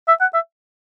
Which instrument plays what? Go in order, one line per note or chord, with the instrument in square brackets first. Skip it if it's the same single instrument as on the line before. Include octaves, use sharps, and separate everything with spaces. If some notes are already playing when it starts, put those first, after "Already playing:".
[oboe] E5
F#5
E5